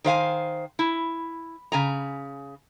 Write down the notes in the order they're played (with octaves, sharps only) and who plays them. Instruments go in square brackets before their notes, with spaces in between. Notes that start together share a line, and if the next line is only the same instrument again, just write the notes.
[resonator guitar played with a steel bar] D#3 C5 F5 G#5
E4
C#3 G#5 A#5